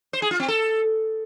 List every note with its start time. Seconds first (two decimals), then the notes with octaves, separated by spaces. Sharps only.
0.13 C5
0.22 G#4
0.31 F4
0.40 C4
0.48 A4